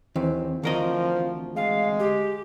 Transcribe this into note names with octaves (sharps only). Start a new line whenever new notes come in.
D#2 E3 C4
D2 F3 A#4 D#5
G#3 F5
G4